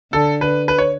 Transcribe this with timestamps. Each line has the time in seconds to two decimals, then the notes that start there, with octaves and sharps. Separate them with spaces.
0.13 D3 A4
0.41 B4
0.68 B4
0.78 C#5